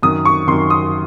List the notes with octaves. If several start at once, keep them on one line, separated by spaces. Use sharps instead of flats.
F#2 D#3 D#6
C#6
F#2 D#3 C6
D#6